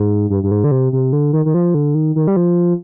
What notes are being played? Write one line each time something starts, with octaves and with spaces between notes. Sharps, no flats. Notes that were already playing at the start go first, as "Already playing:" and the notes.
Already playing: G#2
G2
G2
G#2
D3
C3
C3
D3
D#3
D#3
F3
D3
D#3
D#3
G3
F3